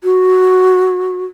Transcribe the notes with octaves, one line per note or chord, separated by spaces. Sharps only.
F#4